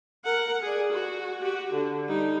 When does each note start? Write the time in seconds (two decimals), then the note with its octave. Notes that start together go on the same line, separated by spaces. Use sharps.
0.24 A#4 F#5
0.63 G#4 D5
0.92 F#4
1.40 F#4 G4
1.73 D3
2.08 G3 D#4